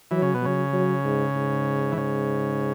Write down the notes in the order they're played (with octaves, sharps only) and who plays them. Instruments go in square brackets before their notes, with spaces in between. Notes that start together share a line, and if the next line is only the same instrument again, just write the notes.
[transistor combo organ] E3 [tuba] F#3
[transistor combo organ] C#3
B2
[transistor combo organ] C#3 [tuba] F#3
[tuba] F#3
G#2
G#2
[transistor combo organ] E3
C#3